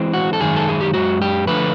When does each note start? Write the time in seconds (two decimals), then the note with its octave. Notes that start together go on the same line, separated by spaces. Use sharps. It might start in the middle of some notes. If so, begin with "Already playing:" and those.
Already playing: E3 G#3 C4
0.13 F#4
0.33 A4
0.40 F#2 D#3 G#3 G#4
0.56 A4
0.69 G#4
0.81 G4
0.94 F#2 D#3 G#3 F#4
1.22 G4
1.47 D3 F3 A3 B4